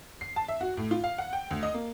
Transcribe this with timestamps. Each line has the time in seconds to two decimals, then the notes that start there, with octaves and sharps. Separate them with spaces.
0.21 C7
0.36 A5
0.48 E5
0.61 F#4
0.77 A2
0.91 F4
1.04 F5
1.18 F#5
1.33 G5
1.51 D2
1.63 D#5
1.74 A#3